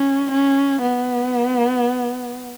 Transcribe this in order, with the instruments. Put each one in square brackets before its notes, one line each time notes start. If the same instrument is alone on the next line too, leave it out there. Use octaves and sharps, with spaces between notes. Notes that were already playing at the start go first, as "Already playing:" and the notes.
Already playing: [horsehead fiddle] C#4
C#4
B3